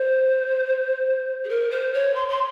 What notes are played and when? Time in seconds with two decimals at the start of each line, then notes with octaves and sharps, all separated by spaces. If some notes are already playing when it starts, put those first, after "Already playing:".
Already playing: C5
1.44 G#4
1.48 A#4
1.70 C5
1.93 C#5
2.15 C6
2.28 C6